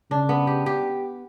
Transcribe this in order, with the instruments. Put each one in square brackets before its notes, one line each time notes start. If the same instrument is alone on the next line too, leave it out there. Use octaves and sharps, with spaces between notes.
[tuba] C#3 [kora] D4
[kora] B3
G4
G4